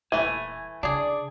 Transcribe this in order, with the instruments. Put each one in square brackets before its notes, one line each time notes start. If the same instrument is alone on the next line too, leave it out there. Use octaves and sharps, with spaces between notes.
[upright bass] D#1 [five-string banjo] E3 A3 [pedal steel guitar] G#5
[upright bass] C#3 [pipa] D4 G#4 [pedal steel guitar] D5